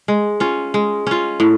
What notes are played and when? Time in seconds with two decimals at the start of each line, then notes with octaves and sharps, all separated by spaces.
0.08 G#3
0.40 C#4 F4
0.74 G#3
1.07 C#4 F4
1.40 A2